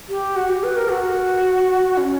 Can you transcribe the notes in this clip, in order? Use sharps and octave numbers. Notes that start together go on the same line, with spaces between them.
G4
F#4
G4
B4
A#4
F#4
C#4